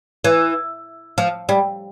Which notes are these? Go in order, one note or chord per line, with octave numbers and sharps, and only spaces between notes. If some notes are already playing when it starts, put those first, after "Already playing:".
E3
F3
G3